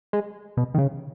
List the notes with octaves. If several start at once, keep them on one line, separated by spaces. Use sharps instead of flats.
G#3
B2
D#3
C#3